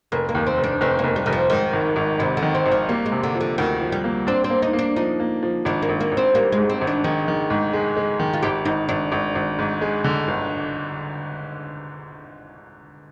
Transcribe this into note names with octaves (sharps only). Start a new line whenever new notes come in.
F1 A#3
A#3
D#2
C4
F1
D4
F1 C4
F1 A#3
G3
F1 D#3
F3
G#2 D#3
G#1
G#1
G#1 C3
D3
D#3
C4
G#1
F3
G3 A#3
G#3
C3
D3
F3
D3
D2 D#3
F3
G3
A#3
C4 D4
C4
A#3
D#4
A#3
D4
F3 D#4
A#3
F3
G#1 D4
A#3
G#1
A#3
G#1
C4
G3 A#3
G#3
G#2
C4
G#1
D4
D#3 G#4
D#3
G#2
G#3
G#3
D#3
F4
G#1 G4
G#1 D#4
G#1 D4
G#1
G#1
G#2
G#3
D3
G1